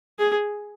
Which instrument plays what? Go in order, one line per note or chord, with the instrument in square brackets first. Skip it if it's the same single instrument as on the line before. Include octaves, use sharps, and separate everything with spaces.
[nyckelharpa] G#4